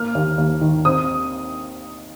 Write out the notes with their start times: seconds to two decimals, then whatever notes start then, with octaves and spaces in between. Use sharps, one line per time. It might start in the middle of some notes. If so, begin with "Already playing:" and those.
Already playing: A#3 F6
0.15 D#2
0.38 D#2
0.61 D#3
0.85 C4 D#6